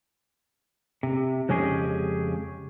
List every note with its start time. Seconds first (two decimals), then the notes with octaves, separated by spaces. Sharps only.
1.03 C3
1.49 F2 C#3 G#3 C#4 G4 G#4